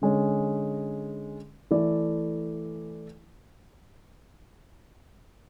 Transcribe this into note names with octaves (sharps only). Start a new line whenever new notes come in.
D3 G#3 C#4
E3 A3 E4 A4 D5